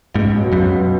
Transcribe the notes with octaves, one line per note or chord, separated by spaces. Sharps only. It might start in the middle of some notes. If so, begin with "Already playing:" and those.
C#2 G#2
B2 F#3
C#2 F#2
B2 F#3